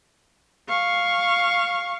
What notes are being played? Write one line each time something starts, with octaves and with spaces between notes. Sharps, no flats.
F5 C#6